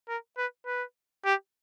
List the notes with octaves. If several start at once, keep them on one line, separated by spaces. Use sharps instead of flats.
A#4
B4
B4
G4